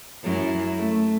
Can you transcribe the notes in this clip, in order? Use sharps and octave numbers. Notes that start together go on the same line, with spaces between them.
F#2 F#3 E4
A3